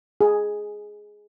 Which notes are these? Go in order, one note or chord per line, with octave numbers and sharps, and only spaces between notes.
G#4